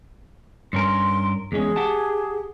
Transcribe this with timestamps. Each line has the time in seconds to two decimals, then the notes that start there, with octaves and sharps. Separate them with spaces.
0.73 G2 C#4 A#4 C6
1.52 E2 G#3 C#4 G#4
1.76 G4 F#5 A5